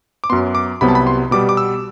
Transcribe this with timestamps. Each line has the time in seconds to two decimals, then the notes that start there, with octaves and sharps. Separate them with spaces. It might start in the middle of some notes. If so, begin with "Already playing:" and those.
0.24 D6
0.30 F#2 F#3 B3 C6
0.55 D6
0.81 C2 C3 F#3 B3 B5
0.88 A5
0.95 B5
1.07 C6
1.31 B2 G3 B3 D6
1.49 D6
1.57 E6